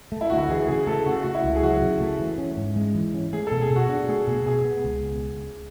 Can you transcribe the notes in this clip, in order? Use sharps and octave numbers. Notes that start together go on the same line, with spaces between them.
A3
E4
D2 F#4
E4
E3 G#4
C#3 G#4
A3 A4
C#3 F#4
A3 F#4
E4
C#2
G#4
F#3 F#4
C#3
A3
E3
C#4
G#2
G#3
E3
C#4
A3 G#4
A4
B2
G#4
B2
F#4
D4
A3 G#4
B2 G#4
B2 G#4
B3
C#2